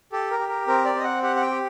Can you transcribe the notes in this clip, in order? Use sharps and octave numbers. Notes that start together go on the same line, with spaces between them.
G4 A4
A#4
G4
A#4
C4 A#4
D5
C4 D#5
F#5
G4 F#5
F#5
G5
G4